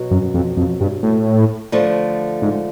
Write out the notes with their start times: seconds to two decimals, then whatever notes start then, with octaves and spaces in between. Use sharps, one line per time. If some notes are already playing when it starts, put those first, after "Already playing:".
Already playing: B2 F#3
0.11 F#2
0.34 F2
0.57 F2
0.80 G2
1.03 A2
1.72 D3 F3 A3
2.42 G#2